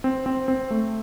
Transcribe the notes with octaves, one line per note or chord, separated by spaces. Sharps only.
C4
C4
C4
A3